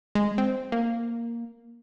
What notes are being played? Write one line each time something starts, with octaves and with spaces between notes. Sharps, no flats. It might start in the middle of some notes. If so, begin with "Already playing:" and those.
G#3
C4
A#3